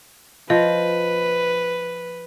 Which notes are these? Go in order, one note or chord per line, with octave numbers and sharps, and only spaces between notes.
F3 B4 D#5